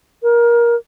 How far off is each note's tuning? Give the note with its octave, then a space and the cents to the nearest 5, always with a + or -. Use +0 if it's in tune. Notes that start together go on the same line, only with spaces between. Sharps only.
A#4 +20